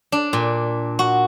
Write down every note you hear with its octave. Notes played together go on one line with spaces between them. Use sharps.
D4
A#2
F#4